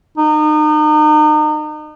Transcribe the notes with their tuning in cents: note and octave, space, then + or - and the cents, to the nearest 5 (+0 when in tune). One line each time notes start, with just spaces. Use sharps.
D#4 -35